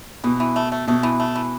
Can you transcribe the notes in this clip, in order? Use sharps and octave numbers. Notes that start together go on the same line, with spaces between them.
B2 E3
E3
A3
A3
B2 A3
E3
A3
E3